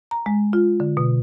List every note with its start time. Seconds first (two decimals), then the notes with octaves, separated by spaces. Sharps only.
0.11 A#5
0.26 G#3
0.53 F4
0.80 D3
0.97 B2